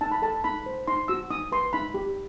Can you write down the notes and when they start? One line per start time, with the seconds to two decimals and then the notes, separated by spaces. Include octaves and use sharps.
0.01 D#4 A5
0.12 B5
0.22 A4 A5
0.44 D#4 B5
0.66 C5
0.88 D#4 C6
1.08 F#4 E6
1.30 D#4 D#6
1.52 B4 C6
1.73 D#4 B5
1.94 G4